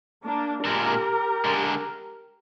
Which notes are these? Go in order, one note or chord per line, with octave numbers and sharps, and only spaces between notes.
A#3 D4
A#2 G#3 D4 G4 A#4
D3 G#3 D4